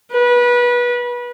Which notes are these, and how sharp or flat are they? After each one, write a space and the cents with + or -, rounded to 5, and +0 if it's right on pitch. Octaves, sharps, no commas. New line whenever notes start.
B4 -25